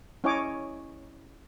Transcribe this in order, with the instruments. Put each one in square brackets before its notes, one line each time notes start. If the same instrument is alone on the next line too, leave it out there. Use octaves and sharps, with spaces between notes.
[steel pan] C#4 E4 C#5 D#5 G#5 D6